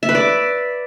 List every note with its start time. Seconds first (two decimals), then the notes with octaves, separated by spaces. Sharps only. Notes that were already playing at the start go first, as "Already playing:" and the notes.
0.03 E5
0.09 B4
0.15 D5